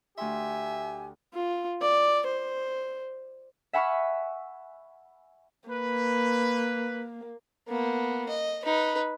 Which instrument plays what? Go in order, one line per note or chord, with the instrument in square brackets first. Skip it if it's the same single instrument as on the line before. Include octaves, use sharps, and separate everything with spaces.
[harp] D2 C6 [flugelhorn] G4 [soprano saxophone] E5 [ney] G#5
[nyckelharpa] F4
D5
C5
[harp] E5 F#5 G#5 B5 C#6 F6
[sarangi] A#3 [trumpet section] B4
[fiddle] A#3 B3
D#5
D#4 B4